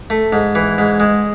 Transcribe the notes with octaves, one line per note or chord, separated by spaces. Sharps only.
A3
G#2
E3
G#2
G#3